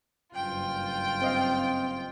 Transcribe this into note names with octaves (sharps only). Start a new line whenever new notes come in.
F#1 G2 F4 G5
C4 D#5 F5